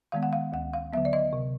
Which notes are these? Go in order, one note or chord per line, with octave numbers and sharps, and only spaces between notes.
D#3 G#3 B3 F5
F#5
F5
D2 F#5
F5
D3 F#3 B3 E5
D5
D#5
C3